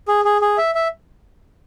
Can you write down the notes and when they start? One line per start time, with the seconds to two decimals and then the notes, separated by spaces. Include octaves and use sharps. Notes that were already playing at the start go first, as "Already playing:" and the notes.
0.08 G#4
0.25 G#4
0.42 G#4
0.58 E5
0.75 E5